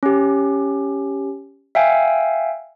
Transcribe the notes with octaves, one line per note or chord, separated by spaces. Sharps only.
C#4 G4
E5 F5 G5 G#5